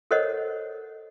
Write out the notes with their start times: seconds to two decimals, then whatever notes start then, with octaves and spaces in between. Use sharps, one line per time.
0.11 A4 A#4 C5 C#5 D#5 F#5